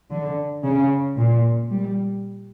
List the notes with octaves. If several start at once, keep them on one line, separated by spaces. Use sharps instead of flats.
D3
C#3
A#2
G3